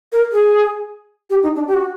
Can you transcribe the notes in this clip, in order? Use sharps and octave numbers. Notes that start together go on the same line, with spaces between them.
A#4
G#4
G4
D#4
D4
G4
F#4